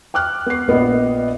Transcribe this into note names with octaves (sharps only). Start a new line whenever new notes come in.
G5 D6 F6 F#6
B3 C7
A#1 B3 D#5